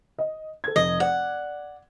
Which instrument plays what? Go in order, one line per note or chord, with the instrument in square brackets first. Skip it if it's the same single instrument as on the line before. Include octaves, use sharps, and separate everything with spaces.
[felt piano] D#5
A4 G#6
[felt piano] F1 [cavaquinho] D#5
[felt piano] D5 [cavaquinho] F#5